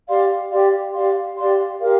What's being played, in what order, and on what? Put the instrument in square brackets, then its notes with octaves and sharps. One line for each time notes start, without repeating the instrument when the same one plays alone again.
[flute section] G4 D5 F5 C6
G4 D5 F5 C6
G4 D5 F5 C6
G4 D5 F5 C6
G4 A#4 F5